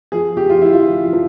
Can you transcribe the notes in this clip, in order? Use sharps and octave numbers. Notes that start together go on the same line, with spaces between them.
F3 G#4
F3 G4
F4
F3 E4
F4
F3
F3